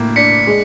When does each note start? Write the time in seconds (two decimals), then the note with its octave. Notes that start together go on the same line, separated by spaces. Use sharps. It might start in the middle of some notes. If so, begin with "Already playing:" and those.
Already playing: A2 A#3
0.16 D4 B6 C#7
0.47 G#3